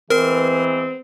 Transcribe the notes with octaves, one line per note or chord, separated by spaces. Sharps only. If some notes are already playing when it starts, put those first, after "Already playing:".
E3 G#3 B3 C4 A#4